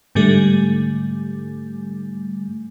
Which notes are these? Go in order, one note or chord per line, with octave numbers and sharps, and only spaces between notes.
G#2 D3 G3 A3